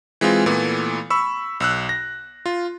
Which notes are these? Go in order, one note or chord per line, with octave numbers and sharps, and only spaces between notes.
E3 G#3 C4 F4
A#2 E3 A3 B3
B5 C#6 E6
B1 E6 F#6
A#6
F4